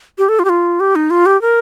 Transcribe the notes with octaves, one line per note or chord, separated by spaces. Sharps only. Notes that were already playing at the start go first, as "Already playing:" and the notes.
G4
A4
F4
G4
F4
G4
D#4
F4
G4
A#4